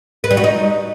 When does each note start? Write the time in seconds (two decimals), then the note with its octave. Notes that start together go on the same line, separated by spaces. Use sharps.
0.24 B4
0.30 G3
0.37 F#4
0.44 D#4